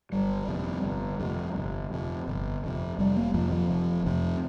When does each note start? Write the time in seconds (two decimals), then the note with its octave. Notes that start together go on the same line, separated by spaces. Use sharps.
0.12 G1 G3
0.48 F2 C3
0.84 G1
1.20 F2 C3
1.56 G1
1.92 F2 C3
2.27 G1
2.64 F2 C3
2.98 F1 G3
3.17 A#3
3.34 F2 C3 F3
3.52 F3
3.70 F1
4.06 F2 C3